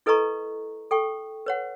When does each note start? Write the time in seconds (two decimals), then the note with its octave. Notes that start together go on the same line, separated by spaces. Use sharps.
0.06 E4 A4 B4 D#5 A#5 C#6
0.91 A4 G5 C#6
1.46 B4 C#5 F#5